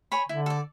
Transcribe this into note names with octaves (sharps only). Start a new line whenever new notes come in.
C#5 G#5 B5
D3 E4
A4 D5